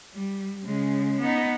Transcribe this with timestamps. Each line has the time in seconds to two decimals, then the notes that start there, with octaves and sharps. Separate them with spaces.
0.13 G3
0.64 C#3 G#3
1.21 B3 D#4